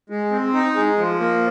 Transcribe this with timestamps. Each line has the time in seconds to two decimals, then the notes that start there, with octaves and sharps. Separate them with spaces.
0.10 G#3
0.31 C4
0.54 D#4
0.75 G#3
0.98 F3
1.20 A#3